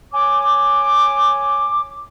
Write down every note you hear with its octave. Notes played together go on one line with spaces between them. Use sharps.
C#5 G#5 D6